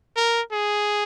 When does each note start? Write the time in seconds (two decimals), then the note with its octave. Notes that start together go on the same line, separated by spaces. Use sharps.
0.17 A#4
0.52 G#4